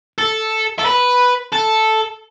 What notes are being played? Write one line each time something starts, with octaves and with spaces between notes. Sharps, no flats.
A4
A4
B4
A4